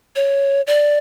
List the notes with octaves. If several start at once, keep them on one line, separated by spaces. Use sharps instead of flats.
C#5
D5